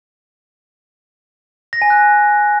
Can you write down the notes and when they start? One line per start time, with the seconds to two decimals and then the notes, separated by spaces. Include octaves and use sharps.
1.73 A#6
1.82 G#5
1.90 F#6